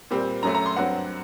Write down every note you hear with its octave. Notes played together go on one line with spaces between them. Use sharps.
A#2 G3 C4
F#2 F#3 A3 A#5
A#5
C6
G2 F#3 C4 F#5